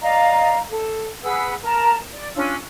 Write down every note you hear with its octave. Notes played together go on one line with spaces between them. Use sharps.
D5 D#5 F5 A#5
A4
G#4 B4 F#5 E6
A#4 A5 A#5
D5
C#4 D4 F4 E6